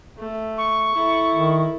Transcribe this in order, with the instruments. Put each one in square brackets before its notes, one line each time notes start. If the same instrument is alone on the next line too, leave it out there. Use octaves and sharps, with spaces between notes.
[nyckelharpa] A3
[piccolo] C#6
[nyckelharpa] E4 A4
[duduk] D#3